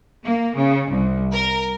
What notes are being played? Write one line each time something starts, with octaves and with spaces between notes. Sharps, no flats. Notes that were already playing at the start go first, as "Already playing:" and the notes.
A#3
C#3
C2
A#4